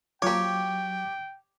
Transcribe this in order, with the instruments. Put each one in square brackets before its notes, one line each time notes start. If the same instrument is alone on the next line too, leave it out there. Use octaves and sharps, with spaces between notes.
[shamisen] F3 A#3 [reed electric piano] F#3 D6 [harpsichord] G4 C#5 [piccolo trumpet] G5